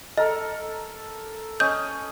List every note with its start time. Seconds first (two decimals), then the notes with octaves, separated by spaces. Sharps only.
0.17 A4 A#4 D#5
1.60 C#4 D#5 G6